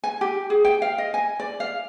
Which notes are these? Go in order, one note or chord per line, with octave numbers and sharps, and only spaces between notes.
G#5
G4
G#4
G5
F5
D#5
G#5
D5
F5